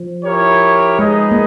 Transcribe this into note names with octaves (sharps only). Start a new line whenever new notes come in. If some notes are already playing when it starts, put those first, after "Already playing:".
Already playing: F3
E4 G4 A#4 C#5
G#3 D#4 G#4 B4 D#5
A#3